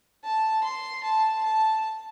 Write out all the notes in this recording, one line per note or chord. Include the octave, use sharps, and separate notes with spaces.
A5
C6
A5
A5